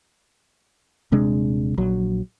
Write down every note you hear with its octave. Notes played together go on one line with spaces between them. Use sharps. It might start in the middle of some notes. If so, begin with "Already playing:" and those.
D#1 C3 G#3 D4
A#1 F#3